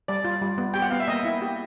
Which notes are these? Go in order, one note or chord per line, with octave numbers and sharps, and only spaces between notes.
G3 D5
F4
G3
B3
G4 G5
F#5
B3 F5
E5
A#3 D#5
E4
G4